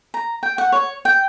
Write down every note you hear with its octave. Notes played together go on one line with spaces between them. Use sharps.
A#5
G5
F#5
C#5
G5